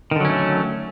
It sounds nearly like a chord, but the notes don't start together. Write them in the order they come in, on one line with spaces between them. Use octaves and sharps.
D#3 D3 F#3 C#4 A3